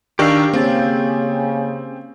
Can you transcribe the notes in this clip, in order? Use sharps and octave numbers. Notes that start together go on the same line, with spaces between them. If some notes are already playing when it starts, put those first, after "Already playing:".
D#3 D4 G4 A#4 F5 C#6 E6
C#3 A#3 C4 A6